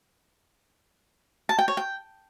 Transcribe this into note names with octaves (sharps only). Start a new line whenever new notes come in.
A5
G5
C#5
G5